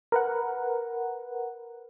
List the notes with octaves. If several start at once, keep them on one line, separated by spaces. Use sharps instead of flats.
A#4 B4 F#5